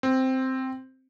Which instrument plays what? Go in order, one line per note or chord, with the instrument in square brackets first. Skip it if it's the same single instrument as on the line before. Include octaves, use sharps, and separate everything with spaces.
[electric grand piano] C4